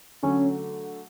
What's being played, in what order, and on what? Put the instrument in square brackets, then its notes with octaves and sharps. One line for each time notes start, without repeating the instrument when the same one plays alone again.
[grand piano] D3 F#3 A3 [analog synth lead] C#4